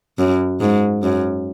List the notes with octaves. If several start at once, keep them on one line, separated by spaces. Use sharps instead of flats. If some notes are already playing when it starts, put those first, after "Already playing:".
F#2
G#2
F#2